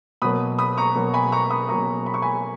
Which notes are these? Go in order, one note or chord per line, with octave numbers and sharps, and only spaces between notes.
B2 F#3 A#3 B5 D#6
B5 D#6
A#5 C#6
B2 F#3 A#3
G#5 B5
A#5 C#6
B5 D#6
B2 F#3 A#3 A#5 C#6
B5
C#6
G#5 B5